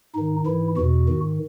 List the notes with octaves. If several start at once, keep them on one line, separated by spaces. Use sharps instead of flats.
G#2 D#3 D#4
G#2 E3 E4
E2 B2 F#4
G#2 D#3